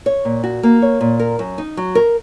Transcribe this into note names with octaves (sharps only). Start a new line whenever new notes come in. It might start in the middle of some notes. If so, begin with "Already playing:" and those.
C#5
A#2
F#4
A#3
C#5
A#2
A#4
F#2
D#4
F#3
A#4